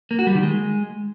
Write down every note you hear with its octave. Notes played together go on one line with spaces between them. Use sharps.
A#3
F#4
G3
D#3
G#3